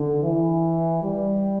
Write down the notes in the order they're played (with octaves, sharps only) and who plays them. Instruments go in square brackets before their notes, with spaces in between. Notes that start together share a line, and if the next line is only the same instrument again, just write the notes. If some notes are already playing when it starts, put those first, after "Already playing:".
Already playing: [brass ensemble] D3
E3
G3